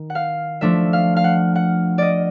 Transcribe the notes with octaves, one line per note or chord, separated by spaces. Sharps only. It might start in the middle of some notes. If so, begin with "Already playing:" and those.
Already playing: D#3
F#5
F5
F3 A3 D4 E5
F5
F5
F#5
F#5
D5 D#5